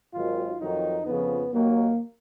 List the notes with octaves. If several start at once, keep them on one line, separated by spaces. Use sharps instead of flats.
G#1 G#2 D#3 F#3 F4
F2 D#3 F#3 D#4
F2 C#3 F3 B3
D#2 D#3 F#3 A#3